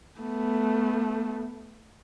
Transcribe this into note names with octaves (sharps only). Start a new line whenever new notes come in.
A3 B3